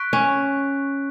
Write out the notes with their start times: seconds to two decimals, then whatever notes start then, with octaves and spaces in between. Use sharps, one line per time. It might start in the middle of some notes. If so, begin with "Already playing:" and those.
Already playing: C#6 F#6 B6 D7
0.13 C#4